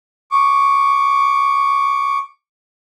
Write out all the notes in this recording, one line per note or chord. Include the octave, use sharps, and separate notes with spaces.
C#6 D6